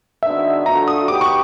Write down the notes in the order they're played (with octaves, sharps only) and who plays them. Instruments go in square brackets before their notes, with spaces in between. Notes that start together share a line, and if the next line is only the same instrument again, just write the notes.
[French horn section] D#3 G#3 B3 D4 F#4 [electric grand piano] E5
[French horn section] D3 F3 A3 D4 F#4 [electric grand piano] A#5
[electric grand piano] D#6
[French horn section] F#3 B3 D#4 G4 [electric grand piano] D6
[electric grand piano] C#6